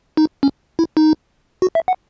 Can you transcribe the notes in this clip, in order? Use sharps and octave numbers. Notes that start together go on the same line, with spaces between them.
D#4
C#4
E4
D#4
F#4
E5
F#5